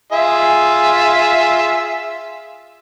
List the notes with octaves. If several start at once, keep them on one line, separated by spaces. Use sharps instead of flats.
F4 G#4 E5